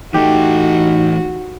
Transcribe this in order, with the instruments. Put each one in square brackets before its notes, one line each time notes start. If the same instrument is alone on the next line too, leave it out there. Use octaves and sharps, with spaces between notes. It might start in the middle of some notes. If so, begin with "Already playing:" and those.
[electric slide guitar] E3 A3 A4 [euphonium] D#4 [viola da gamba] F#4 [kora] G4